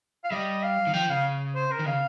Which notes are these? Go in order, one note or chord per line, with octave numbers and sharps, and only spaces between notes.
F5
G3 D#5
F5
D#3
F3 G5
C#3 F5
C5
A#4
D#3
C#3 F5